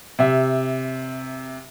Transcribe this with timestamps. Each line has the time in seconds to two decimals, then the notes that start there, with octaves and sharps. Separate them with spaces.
0.19 C3 E5